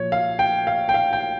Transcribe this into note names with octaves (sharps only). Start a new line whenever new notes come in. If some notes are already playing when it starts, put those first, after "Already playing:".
Already playing: A#2 F3 C#5
F5
G5
F5
G5
F5
G5